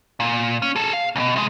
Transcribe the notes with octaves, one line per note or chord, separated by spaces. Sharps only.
A#2
C#4
G#4 A4
F5
C#2 B2
C3 G#3